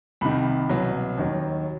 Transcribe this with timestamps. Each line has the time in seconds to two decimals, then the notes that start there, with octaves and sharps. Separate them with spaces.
0.21 C2 C3 D#3 B5
0.69 C2 B2 F#3
1.18 D#2 D#3 F#3